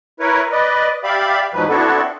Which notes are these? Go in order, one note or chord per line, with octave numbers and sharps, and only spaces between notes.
E4 A#4 B4 C#5
B4 D5 D#5
G4 D5 E5 F5 B5
E2 G#2 B2 F3 F#3 B4
B3 C4 D4 E4 F#4 A4